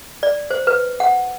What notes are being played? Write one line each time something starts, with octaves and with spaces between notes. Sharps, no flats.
D5
C5
B4
F#5